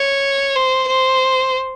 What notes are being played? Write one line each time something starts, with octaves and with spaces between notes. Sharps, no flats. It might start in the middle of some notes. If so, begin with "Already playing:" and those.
Already playing: C#5
C5
C5